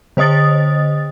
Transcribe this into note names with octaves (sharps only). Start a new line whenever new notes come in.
D3 C5 D#5 D#6 A6